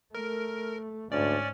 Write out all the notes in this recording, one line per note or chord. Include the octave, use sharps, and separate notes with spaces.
A3 A#4
D2 G#2 C#4 D5